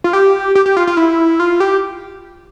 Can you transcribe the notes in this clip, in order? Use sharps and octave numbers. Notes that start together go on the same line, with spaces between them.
F4
G4
G4
G4
F4
F4
E4
F4
G4